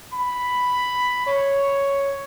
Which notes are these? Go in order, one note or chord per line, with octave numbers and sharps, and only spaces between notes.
B5
C#5